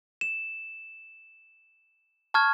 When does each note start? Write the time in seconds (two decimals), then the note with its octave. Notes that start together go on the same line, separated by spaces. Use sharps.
0.21 E7
2.34 A5 C#6 F6 G#6